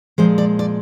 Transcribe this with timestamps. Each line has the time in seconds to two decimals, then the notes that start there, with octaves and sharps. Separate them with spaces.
0.18 A#2 F3 G#3 C5
0.38 D5
0.59 D5